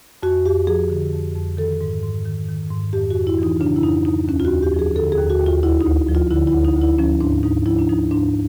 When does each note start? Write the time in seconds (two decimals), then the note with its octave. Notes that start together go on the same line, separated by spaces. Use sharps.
0.23 F2 F#4
0.46 F2 G4
0.67 F3 G#4
0.90 D3
1.13 F2
1.36 F2
1.57 D#3 A4
1.81 G#2
2.03 G#2
2.25 D#3
2.49 D#3
2.70 G#2
2.93 F2 G4
3.10 F#4
3.16 F2
3.27 E4
3.39 E3 D#4
3.60 C#3 D4
3.76 E4
3.83 F2 D#4
4.05 F2 D#4
4.28 D#2 C#4
4.40 F4
4.45 F#4
4.50 D#2
4.63 G4
4.74 F3
4.79 G#4
4.96 D3 A4
5.12 G#4
5.18 D#2
5.30 F#4
5.41 D#2 F4
5.63 D2 E4
5.81 D#4
5.86 D2
6.08 F3
6.15 F4
6.31 D3 E4
6.47 E4
6.54 D2
6.65 D#4
6.77 D2 E4
6.99 F3 C#4
7.21 G#2 D4
7.43 G#2 D#4
7.66 F3 E4
7.79 D4
7.89 F3 D#4
8.11 G#2 D4